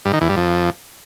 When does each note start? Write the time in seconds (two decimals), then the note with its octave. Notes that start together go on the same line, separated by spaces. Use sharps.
0.05 G2
0.13 D#3
0.21 E2
0.29 G2
0.37 F2